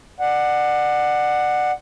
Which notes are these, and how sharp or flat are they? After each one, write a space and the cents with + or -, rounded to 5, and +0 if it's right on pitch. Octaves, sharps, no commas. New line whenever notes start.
D5 +30 F#5 +0